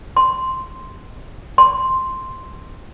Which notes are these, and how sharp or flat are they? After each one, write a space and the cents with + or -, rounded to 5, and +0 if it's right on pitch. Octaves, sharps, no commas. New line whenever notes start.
C6 -5
C6 +0